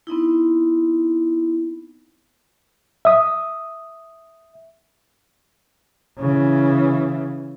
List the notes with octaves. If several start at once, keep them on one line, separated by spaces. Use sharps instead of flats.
B3 C4 D#4 E4
E5 D#6
C#3 E3